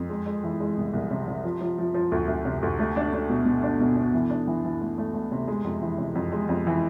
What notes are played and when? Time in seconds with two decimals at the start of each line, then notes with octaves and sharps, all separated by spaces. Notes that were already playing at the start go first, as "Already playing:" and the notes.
Already playing: F2
0.10 G#3
0.26 G#3
0.44 E3
0.60 G#3
0.77 C2
0.93 C2
1.10 C3
1.28 C3
1.44 F3
1.61 F3
1.78 F3
1.94 F3
2.12 D2
2.28 D2
2.45 C3
2.63 D2
2.79 A3
2.96 D4
3.13 D4
3.29 B2
3.46 B2
3.63 D4
3.80 B2
3.97 B2
4.14 E3
4.30 D4
4.47 E3
4.65 E3
4.81 A3
4.98 A3
5.14 A3
5.32 C3
5.48 G#3
5.64 F2
5.81 E3
5.98 C3
6.15 F2
6.32 G#3
6.49 F2
6.67 E3